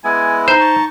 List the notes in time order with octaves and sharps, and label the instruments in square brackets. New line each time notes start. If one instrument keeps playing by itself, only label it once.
[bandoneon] G#3 B3 E4 [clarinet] G#5
[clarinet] D#4 [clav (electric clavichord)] C5
[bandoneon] A5 C#6